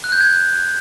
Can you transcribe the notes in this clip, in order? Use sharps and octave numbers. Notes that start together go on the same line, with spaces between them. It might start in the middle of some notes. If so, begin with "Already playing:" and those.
F#6
G6
G#6